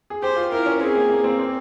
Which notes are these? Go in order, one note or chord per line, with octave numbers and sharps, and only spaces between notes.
G#4
G4 C5
F4
E4 A#4
C#4
C4 G#4
A#3
A#3
C4
C4